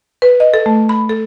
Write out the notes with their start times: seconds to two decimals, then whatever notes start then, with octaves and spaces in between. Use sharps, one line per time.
0.22 B4
0.40 D#5
0.54 A4
0.66 A3
0.89 B5
1.09 A4